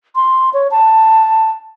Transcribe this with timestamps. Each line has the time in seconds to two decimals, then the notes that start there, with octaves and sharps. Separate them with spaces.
0.16 C6
0.54 C#5
0.71 A5